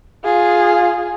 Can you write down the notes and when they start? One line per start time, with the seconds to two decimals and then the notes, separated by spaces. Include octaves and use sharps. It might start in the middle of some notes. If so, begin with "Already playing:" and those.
0.24 F4 G#4